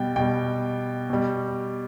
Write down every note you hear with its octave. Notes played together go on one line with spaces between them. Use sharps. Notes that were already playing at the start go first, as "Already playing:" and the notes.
Already playing: B2 G3 G5
B2 G3 G5
B2 G3